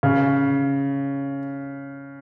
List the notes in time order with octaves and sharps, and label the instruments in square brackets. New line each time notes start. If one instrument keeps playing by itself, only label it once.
[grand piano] C#3